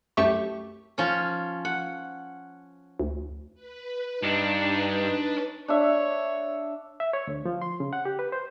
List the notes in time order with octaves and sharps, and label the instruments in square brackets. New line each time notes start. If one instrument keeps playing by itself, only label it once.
[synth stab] C2 F#2 A3 G4 E5 C#6
[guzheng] F3 C#4
F#5
[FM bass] D2
[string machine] B4
[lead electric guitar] G2 [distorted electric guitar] D4 [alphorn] D#4
[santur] D4 E5 [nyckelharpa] C#5
[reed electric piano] E5
C#5
D2
F3
C6
C#3
F#5
G4
B4
C5